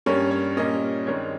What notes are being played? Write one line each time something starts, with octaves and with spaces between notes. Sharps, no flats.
G2 G3 A#3 C#4 C#5
C#5
A#2 G3 A#3 C#4 D#5
G2 D#3 G#3 C4 C#5